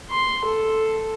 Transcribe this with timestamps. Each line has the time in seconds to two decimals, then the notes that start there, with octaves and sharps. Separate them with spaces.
0.10 C6
0.45 A4